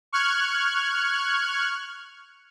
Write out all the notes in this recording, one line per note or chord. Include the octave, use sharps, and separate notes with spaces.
C#6 F6 F#6 G#6